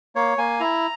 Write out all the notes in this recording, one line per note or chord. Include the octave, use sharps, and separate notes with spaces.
A#3 C#5
A#3 G#5
E4 A#5